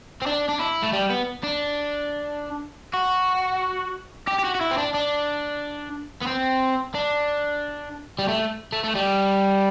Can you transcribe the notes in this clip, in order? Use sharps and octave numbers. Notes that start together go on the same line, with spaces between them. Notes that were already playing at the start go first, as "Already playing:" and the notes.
C4
D4
D4
E4
A3
G3
B3
D4
F#4
G4
G4
F#4
F#4
E4
C4
D4
D4
B3
C4
D4
G3
A3
A3
A3
G3